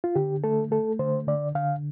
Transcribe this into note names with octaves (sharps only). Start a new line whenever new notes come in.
F4
D3 G4
A3 A4
A3 A4
D3 C5
D3 D5
D3 F5